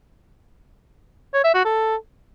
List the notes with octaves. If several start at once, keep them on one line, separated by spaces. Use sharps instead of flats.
C#5
E5
F#4
A4